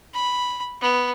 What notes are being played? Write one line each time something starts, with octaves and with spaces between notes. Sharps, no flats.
B5
B3